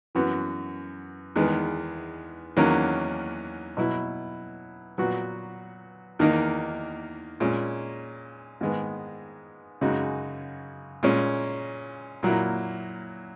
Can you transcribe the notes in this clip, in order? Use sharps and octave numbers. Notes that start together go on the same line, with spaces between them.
F#2 E3 B3 F#4
E2 D#3 G#3 B3
E2 D#3 F#3 A#3 C#4
B2 F#3 B3 E4
A#2 F#3 B3 F#4
E2 D#3 A#3 D#4
A#2 G#3 C#4
G#2 D#3 G#3 B3
F#2 C#3 G#3 D#4 F#4
A#2 G#3 C#4
A#2 F#3 A#3 E4